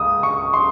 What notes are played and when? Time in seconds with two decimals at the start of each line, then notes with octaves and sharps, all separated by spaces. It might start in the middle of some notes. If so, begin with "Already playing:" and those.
Already playing: C#2 D#6
0.23 C#6
0.54 C6